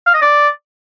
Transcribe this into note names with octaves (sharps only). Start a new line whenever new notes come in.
F5
D#5
D5